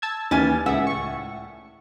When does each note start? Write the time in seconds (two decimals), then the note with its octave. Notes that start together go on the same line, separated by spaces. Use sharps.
0.02 A5 E6 G#6
0.31 D#2 E3 G3 C#4 G#5 A6
0.66 C#2 A2 E5 F#5
0.87 C#6